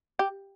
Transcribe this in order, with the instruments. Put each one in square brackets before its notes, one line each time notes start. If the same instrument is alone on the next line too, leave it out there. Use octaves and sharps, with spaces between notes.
[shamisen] G4